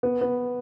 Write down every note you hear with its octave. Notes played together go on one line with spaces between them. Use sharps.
B3
B3